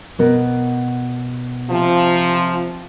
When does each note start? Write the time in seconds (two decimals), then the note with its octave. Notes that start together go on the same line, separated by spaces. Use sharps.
0.19 B2 B3 A#4
1.70 C3 F3